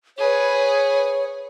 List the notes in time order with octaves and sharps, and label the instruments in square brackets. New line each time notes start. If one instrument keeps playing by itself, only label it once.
[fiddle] G#4 B4 [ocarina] C#5